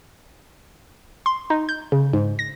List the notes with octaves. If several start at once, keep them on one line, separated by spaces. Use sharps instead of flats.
C6
D#4
G6
C#3
G#2
A#6